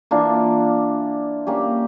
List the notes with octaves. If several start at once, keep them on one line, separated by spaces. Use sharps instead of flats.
E3 A#3 D4 F4
G3 A#3 C#4 G4